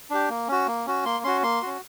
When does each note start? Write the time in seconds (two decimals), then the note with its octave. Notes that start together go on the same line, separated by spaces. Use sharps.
0.10 D4 G4
0.29 A#3
0.48 C#4 F#4
0.67 A#3
0.86 C#4 F#4
1.05 A#3 C6
1.24 C#4 F#4 C6
1.43 A#3 C6
1.62 C#4 F#4